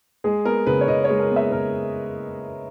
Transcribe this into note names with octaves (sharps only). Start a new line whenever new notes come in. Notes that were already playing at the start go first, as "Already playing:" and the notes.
G#3 G#4
B3 A#4
C#3 B4
C#5
C#3 D#5
C#5
G#3
A#4
B3
E5
C#3 A#4